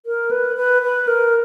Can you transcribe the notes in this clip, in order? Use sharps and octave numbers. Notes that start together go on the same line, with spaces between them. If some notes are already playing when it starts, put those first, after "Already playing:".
A#4
B4
B4
B4
A#4